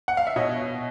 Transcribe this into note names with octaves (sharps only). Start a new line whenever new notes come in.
F#5
F5
E5
B2 C#5 D#5